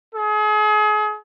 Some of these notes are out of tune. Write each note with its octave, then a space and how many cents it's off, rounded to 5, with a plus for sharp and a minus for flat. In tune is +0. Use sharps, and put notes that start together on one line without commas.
G#4 +35